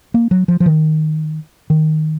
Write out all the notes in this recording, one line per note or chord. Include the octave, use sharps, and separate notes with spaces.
A#3
F#3
F3
F3
D#3
D#3